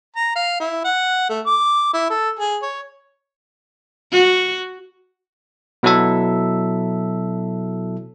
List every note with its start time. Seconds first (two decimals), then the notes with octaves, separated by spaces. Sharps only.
0.16 A#5
0.36 F5
0.60 E4
0.85 F#5
1.29 A3
1.46 D6
1.94 E4
2.10 A4
2.39 G#4
2.63 C#5
4.12 F#4
5.83 B2 F#3 E4 A4 E5